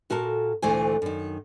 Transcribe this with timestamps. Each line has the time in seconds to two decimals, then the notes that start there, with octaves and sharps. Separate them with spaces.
0.10 A#2 F#4 A4 A#4 A5
0.62 D2 A#2 E3 A3 C5 G#5
1.02 F#2 D#3